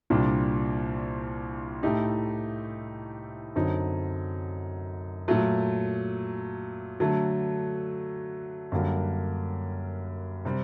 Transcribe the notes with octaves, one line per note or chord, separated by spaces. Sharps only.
C2 A#2 G3 D4
A2 A3 D#4 G4
F#2 D3 F#3 C4 D#4
A#2 F#3 A3
D3 F#3 A3
F#2 D3 G3 A#3 F#4
C3 G3 C4